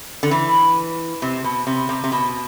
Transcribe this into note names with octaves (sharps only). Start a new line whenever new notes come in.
D3
E3
C3
B2
C3
C3
C3
B2